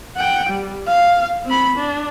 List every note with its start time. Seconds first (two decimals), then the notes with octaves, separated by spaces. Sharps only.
0.16 F#5 G5
0.50 G3
0.87 F5
1.45 C4 B5
1.76 D4